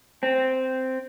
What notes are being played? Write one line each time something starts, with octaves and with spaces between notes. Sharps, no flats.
C4